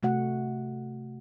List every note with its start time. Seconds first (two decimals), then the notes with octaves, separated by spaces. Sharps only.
0.03 C3 A3 F#4 F#5